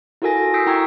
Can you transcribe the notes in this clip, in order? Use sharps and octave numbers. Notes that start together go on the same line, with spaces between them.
E4 F#4 A4 A#4 G#5 A#6
D#6 E6 G6 B6 C7 D7
E4 G5 A#5 C#6 E6 G#6